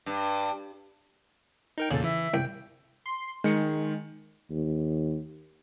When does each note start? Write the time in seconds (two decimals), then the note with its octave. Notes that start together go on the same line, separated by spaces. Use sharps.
0.06 G2
1.78 D#4 A#4 G5
1.91 E2 A#2 C#3 A4
2.03 E3 E5
2.34 C2 G5
3.06 C6
3.44 D#3 G#3 C#7
4.50 D#2